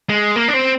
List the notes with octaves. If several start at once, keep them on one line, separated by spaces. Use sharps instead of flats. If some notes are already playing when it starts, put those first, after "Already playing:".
G#3
A#3
D4
C4